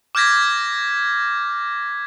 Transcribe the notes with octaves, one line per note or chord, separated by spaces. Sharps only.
D6 F6 G6 G#6 A#6 B6